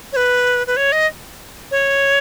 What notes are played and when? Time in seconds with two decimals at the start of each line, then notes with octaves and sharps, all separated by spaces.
0.13 C#5
0.16 B4
0.67 B4
0.77 C#5
0.92 D#5
1.71 C#5